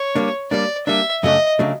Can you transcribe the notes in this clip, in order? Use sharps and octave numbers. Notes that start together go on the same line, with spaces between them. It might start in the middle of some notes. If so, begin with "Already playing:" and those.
Already playing: C#5
G3 A#3 D4
G3 A#3 D4 D5
G3 A#3 D4 E5
F#2 C#3 F#3 A3 D4 D#5
C#3 F#3 A3 D4